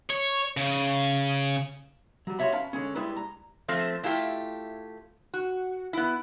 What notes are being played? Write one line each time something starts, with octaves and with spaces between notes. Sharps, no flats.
C#5
C#3
F#3 G3
F4 F#4 G#4 C#5 E5 B5
C#4 B4 F5 A5 B5
D3 G#3 C#4
G3 G#3 E4 B4 D5
A#5
F3 A3 C4
A3 E4 F4 G4
F#4
B3 E4